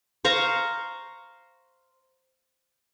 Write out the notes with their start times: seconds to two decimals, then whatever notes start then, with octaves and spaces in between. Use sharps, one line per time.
0.25 C5 F5 A#5 C#6